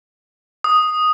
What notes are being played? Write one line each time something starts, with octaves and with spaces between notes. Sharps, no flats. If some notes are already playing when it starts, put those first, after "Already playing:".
D#6